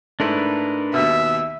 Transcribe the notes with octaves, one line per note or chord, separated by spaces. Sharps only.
G#2 A3 D4 E4 A#4 B4
D#2 B2 E5